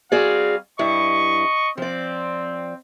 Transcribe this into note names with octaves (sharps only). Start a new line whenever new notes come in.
G3 C4 F#4 G#4 D5 F5
G2 E4 D#5 C#6
F3 C4 D5